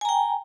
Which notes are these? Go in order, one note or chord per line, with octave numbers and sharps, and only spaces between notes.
G5 G#5 A#5